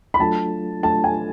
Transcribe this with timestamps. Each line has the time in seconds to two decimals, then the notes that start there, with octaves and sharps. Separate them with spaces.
0.14 B5
0.20 F#3 A3 D4 F4 A4 A5
0.83 F#3 A3 D4 F4 A4 A5
1.04 G#5